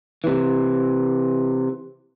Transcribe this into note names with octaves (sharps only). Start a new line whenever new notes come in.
C3 E3